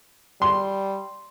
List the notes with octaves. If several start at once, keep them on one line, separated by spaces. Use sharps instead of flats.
G3 C6